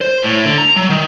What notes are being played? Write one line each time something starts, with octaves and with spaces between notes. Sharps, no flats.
C5
A2
D3
A#5
F#3
D#3